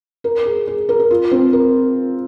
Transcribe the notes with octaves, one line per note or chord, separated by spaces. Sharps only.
A#4
G#4
G#4
A#4
A#4
F4
C4
A#4